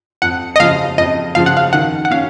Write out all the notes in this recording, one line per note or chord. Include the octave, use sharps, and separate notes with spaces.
F2 F#5
D#5
C#3 F3 F5
F2 D#5
C#3 F3 F5
F#5
F5
D#3 F#5
F#5
C#4 F5